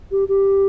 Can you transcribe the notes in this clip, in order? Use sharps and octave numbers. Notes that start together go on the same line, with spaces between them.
G4
G4